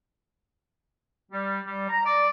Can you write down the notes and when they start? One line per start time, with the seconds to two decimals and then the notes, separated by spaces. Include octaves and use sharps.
1.31 G3
1.65 G3
1.88 A#5
2.05 D5